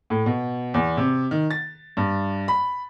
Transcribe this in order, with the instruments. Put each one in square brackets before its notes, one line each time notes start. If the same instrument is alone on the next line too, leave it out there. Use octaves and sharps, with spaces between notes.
[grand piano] A2
B2
E2
C3
D#3
A6
G2
B5